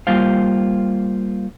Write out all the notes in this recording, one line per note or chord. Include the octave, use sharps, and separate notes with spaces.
G3 A#3 F4 C5 F5